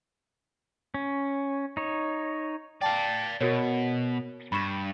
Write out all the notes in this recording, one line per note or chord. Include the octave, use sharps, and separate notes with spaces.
C#4
D#4 C#5
D5 F5 G5 A5
B2 F#4 A#4 C#5
G2 B5 C#6 E7